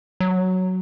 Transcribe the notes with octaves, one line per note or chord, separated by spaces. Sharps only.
F#3